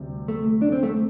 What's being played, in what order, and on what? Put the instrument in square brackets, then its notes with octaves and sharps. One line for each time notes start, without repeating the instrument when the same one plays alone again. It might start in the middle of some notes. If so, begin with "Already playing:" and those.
Already playing: [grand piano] D2 C3 G3
[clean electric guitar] A3
D4
C4
A3